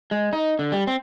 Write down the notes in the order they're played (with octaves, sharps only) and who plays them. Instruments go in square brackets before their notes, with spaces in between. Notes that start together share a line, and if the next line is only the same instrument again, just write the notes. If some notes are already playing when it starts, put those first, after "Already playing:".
[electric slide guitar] G#3
D#4
D3
G3
C4